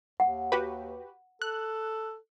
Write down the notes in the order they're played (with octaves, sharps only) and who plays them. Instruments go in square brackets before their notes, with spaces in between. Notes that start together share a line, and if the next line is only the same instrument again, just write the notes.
[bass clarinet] D#2 [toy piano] F#5
[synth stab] F#4 G4 B4
[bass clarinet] A4 [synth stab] F#6